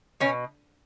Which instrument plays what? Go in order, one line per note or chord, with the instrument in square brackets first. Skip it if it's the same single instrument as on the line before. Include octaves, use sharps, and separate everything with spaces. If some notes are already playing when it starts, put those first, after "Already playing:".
[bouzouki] B2 C#4